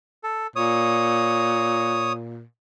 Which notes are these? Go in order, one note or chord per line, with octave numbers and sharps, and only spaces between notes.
A4
A#2 C#5 D#6